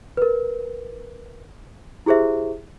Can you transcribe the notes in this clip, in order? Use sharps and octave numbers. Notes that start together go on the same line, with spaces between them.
A#4 B4
E4 G4 G#4 C5 E5